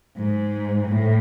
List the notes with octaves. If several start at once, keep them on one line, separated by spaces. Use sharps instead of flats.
G#2
A2